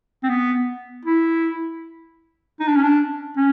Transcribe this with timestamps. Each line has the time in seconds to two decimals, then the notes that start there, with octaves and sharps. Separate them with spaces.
0.23 C4
0.29 B3
1.05 E4
2.60 D#4
2.68 D4
2.76 C#4
2.83 D4
3.37 C#4